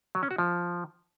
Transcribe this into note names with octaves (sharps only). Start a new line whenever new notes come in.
F#3
C#4
F#4
F3